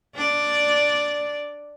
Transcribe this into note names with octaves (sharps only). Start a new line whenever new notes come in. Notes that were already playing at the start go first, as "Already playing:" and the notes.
D4 D5